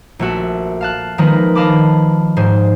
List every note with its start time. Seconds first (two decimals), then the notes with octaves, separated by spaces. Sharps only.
0.19 A#1 A3 F#4 E5
0.81 F5 A5 F#6
1.18 D#3 F3 G#3 A#3 A#4 B4
1.55 D#5 F5 A5 B5 D6
2.36 D#1 G#2 G#4 C5